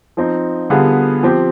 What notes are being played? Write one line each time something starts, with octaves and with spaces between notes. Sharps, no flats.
F3 C4 D#4
D3 G3 B3 F4 G#4
F3 C4 G4